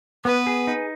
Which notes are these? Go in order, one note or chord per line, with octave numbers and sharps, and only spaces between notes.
B3 B4
G#4
D#4